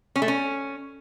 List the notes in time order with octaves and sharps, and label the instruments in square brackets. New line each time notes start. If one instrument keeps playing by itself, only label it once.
[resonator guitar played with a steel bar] C#4
A3
C#4